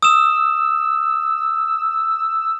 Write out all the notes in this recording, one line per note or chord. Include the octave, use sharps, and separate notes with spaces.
D#6 E6 E7